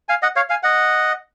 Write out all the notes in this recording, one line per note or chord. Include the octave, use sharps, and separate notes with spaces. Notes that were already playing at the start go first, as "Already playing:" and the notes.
F5 G#5
D#5 F#5
C#5 F5
F5 G#5
D#5 F#5